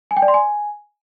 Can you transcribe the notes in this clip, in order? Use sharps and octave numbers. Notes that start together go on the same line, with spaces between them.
G#5
G5
D5
C6
G#5